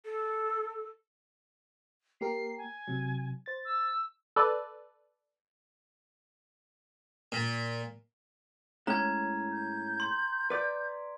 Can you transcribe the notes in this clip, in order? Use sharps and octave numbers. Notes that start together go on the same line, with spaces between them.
A4
A#3 G4 A#4 C7
G#5
C3 F#3
C5 A6
E6
A4 B4 D5
A#2
A2 G#3 C#4 A#5 G#6
G6
C6
B4 D5